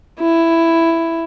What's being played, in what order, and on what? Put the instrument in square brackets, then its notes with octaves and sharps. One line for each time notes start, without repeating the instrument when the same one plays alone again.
[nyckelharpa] E4